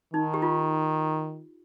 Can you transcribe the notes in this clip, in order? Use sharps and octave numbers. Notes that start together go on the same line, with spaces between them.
D#3 D#4
G4
F4